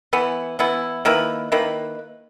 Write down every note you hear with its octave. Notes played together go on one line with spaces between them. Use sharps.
E3 B3 E4
E3 B3 E4
D#3 A#3 E4 B4
D#3 A#3 E4 B4